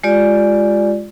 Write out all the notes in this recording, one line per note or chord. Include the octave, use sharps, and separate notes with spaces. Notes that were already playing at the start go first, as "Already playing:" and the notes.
G#3 F4 G4 D5